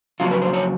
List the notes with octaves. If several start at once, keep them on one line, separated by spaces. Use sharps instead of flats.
F2 C#3 F#3 F4
B4
C5
C#5